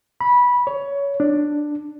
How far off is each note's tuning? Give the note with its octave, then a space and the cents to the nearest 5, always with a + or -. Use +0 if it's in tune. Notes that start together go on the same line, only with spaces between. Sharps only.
B5 -15
C#5 +20
D4 +10